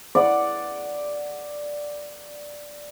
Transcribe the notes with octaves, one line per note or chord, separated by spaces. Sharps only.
D5 F#5